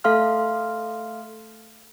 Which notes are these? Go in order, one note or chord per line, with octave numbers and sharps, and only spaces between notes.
A3 A4 E5 F5 C6 F6